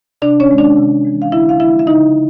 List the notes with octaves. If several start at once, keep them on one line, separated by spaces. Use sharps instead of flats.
C3 D4 D5
C#4 C#5
D#3 G#3
D4 D5
C3
E3 G#3
F5
D3 E4 E5
F5
F3 G#3 E4 E5
E5
C#3 D#4 D#5